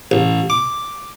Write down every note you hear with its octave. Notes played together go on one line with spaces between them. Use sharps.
A1
D6